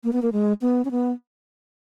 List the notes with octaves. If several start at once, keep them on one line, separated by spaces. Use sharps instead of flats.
A#3
B3
A#3
G#3
B3
C#4
B3